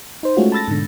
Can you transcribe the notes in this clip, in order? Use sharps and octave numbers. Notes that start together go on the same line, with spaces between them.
D#4 C5
G#3 A3 C#4 F4 F#4
A5 B5 E6 A6 A#6
G#2 B2 D3